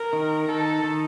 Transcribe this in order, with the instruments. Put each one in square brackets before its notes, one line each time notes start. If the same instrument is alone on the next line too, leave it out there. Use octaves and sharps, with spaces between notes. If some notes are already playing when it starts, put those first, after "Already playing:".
Already playing: [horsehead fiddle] A#4
[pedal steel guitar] D#3
[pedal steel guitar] D#4 [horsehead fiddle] A4
[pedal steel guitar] D#3